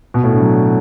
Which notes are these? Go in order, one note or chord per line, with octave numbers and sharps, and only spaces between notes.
B2
A2
D3
F#3